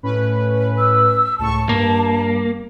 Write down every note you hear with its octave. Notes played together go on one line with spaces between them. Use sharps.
A2 C#4 B4
E6
C#2 A2 A5 C#6
G2 A#3